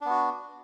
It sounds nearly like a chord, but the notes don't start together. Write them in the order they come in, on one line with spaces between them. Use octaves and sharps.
D4 B3 F#4